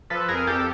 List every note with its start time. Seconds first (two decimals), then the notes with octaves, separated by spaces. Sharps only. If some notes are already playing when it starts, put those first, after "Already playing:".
0.10 F3 A4 B4
0.28 F2 G#4 A#4
0.47 F2 G4 A4